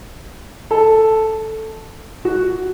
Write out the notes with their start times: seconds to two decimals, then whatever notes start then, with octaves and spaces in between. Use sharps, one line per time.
0.71 A4
2.25 F#4